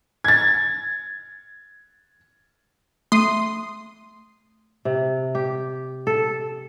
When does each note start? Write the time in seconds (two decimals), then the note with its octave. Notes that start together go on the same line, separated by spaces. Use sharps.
0.24 G#6 A6
3.12 A3 C6 D#6
4.85 C3
5.35 G4
6.07 A4